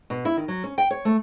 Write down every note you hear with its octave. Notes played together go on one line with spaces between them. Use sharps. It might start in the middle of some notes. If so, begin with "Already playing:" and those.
B2
E4
D#3
F#3
C#4
G5
C#5
A3